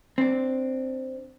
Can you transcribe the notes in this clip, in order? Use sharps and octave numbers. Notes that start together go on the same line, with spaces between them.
C4 D4